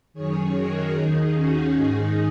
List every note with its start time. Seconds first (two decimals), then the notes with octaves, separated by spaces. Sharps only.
0.13 F#2 D#3 G#4 C#5
0.54 F#4 A#4
0.94 D#2 D#3 D#4 G#4
1.34 C#4 F#4
1.74 G#2 D#3 D#4 G#4